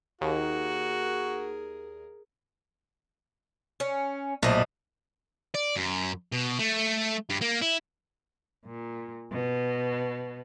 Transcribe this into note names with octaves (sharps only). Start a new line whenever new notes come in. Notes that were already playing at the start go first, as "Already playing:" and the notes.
D#2 F#4 G#4 A#4
C#4
B1 A#2 A3 C5 D5 D#5
D5
F#2
B2
A3
G2
A#3
E4
A#2
B2